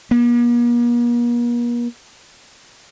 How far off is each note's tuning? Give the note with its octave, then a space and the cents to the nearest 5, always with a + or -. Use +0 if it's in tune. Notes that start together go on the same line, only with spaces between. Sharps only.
A#3 +45